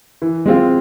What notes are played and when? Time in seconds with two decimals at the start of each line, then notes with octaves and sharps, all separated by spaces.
0.22 E3
0.46 G#3 C4 F4